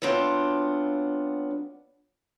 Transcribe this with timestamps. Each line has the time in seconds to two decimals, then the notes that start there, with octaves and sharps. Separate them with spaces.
0.02 F#3 B3 C4 D4 F4